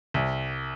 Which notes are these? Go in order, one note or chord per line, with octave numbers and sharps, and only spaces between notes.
C2